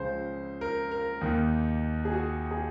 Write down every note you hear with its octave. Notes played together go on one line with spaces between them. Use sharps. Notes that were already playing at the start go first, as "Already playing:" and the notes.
Already playing: C#2 C#3 F3 C5
A#4
A#4
D#2 D#3
G#4
F#4
G#4